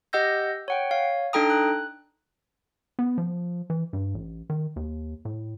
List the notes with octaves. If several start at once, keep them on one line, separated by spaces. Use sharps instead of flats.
G4 D#5 F#5 E6 G6 A#6
C#5 F#5 G5
C#5 F5
D4 D#4 A4 G5 A#5 D#6
F#6
B3
F3
E3
G2
A1
D#3
D#2
A2